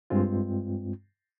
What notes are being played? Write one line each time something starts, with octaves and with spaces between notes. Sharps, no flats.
G2 G#3 C4 F4